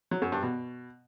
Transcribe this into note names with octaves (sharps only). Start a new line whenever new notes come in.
F#3
F#2
G2
B2